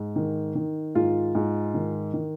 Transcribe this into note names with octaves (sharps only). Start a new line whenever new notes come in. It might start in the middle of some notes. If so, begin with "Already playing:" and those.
Already playing: G#2
D#3
D#3
G#2 F4
G#2
D#3
D#3